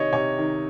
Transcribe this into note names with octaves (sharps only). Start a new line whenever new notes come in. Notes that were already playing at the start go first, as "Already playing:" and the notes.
Already playing: C3 D#3 C#5 D#5
C3 C#5
D#3